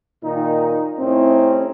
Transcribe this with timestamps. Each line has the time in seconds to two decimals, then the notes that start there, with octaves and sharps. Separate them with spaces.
0.23 A#2 D#3 D#4
0.98 C2 A2 C4 C#4 D#4 E4